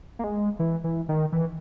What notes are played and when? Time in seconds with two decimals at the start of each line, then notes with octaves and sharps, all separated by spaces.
0.19 A#3
0.24 G#3
0.59 E3
0.84 E3
1.09 D#3
1.32 E3